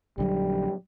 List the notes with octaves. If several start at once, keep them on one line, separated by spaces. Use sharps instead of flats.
A#1 D3 F#3 G3